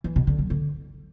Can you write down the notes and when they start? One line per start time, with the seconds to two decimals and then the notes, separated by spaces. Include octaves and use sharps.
0.04 E3
0.16 B2
0.27 D3
0.39 F#3
0.50 D3